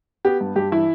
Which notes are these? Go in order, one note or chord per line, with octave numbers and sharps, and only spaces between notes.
B3 G4
G2
G2 G4
E3 E4